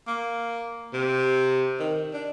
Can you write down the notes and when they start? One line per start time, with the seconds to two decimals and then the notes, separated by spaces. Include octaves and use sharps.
0.07 A#3
0.93 C3
1.80 D#3
2.13 D4